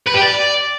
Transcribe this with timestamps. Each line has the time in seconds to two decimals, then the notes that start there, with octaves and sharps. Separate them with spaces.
0.06 B4
0.14 G4
0.21 D5